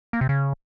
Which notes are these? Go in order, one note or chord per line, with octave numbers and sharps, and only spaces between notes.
A#3
C3
C#3